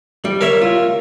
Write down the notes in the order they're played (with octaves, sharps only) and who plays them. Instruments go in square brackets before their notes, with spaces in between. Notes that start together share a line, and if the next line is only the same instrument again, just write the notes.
[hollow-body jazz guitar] G3
[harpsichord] A#4 C#5 E5
[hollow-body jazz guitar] F4